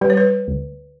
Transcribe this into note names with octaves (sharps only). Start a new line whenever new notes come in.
G3 B4
C#5
B4
D2